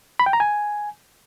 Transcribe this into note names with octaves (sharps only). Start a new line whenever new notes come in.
B5
G5
A#5
G#5